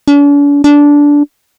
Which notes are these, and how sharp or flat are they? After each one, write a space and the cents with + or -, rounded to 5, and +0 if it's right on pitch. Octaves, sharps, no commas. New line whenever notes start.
D4 -45
D4 -15